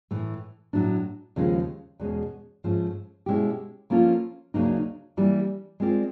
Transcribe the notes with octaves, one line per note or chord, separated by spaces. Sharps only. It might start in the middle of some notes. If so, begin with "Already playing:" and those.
A2 E3 A3
A2 F#3 A3 D4
D#2 C#3 F3 G#3 C#4
E2 B2 G#3 C#4
G#2 F3 A3 C#4
B2 G#3 C#4 E4 G4
F3 A#3 C#4 F4 A4
D2 C#3 F#3 A#3 D#4
E3 G3 A#3 D4
G#3 C4 F4 A#4 D5